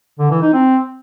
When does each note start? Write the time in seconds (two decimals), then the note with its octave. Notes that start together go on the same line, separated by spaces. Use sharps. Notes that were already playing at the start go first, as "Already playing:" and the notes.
0.19 D3
0.30 E3
0.42 D#4
0.53 C4